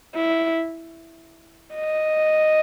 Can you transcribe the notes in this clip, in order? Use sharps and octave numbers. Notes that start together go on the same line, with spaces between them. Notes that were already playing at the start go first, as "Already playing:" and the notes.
E4
D#5